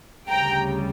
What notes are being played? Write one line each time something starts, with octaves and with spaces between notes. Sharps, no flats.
D2 C#3 G3 G5 A#5